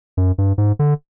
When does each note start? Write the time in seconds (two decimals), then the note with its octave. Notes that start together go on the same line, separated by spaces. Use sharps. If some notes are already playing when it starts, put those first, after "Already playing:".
0.17 F#2
0.38 G2
0.58 G#2
0.79 D3